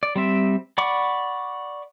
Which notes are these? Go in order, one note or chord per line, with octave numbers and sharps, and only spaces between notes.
D5
G3 C4 E5
D5 F#5 B5 C#6 D6